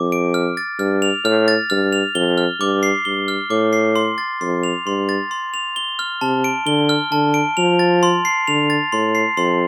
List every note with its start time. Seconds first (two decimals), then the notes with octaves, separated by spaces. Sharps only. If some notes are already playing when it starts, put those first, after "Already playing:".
Already playing: F2 D6
0.12 D7
0.34 F6
0.57 A6
0.79 G2 F6
1.02 F7
1.25 A2 F6
1.48 A6
1.70 G2 F6
1.93 F7
2.15 F2 G7
2.38 F6
2.60 G2 D6
2.83 C7
3.05 G2 G7
3.28 F6
3.50 A2 D6
3.73 C7
3.96 C6
4.18 A6
4.41 F2 C6
4.63 F7
4.86 G2 C6
5.09 A6
5.31 C6
5.54 F7
5.76 G7
5.99 F6
6.21 C3 A5
6.44 D7
6.66 D3 G7
6.89 F6
7.12 D3 A5
7.34 D7
7.57 F3 F7
7.79 A6
8.03 C6
8.25 C7
8.47 D3 F7
8.70 A6
8.92 A2 C6
9.15 C7
9.37 F2 C6